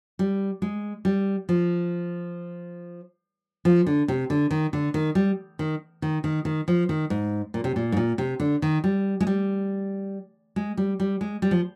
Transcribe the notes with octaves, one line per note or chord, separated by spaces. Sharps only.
G3
G#3
G3
F3
F3
D3
C3
D3
D#3
D3
D#3
G3
D#3
D#3
D#3
D#3
F3
D#3
G#2
A#2
C3
A#2
G#2
A#2
C3
D3
D#3
G3
G#3
G3
G#3
G3
G3
G#3
G3
F3